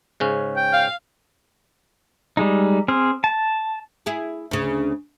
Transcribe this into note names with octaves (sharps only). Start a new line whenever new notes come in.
G#2 C#3 C#4
G5
F5
G3 G#3 D#4
C4 G#4 F6
A5
E4 G#4
D2 C#3